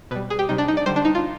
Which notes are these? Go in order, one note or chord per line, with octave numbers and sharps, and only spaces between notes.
B2 G3 B4
G#4
G4
C3 G3 D#4
D4
D#4
D5
D3 G3 C5
D4
D#4
F4